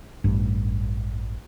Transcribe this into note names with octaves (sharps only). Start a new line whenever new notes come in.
A1 G2